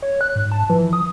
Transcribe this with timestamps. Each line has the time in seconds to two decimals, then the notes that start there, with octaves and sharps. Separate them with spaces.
0.02 C#5
0.21 F#6
0.35 G#2
0.52 A5
0.70 E3 F3
0.93 D#6